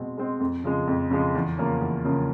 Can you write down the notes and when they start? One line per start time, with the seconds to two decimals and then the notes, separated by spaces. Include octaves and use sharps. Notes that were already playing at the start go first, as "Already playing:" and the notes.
Already playing: B2 G#3 C4
0.18 G#3 C4
0.40 F2
0.64 C#3 F3 G#3
0.87 F2
1.11 C#3 F3 G#3
1.35 E2
1.58 C#3 F3 A#3 C#4
1.81 E2
2.05 C#3 F3 A#3 C#4